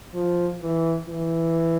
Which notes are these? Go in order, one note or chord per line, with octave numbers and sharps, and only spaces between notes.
F3
E3
E3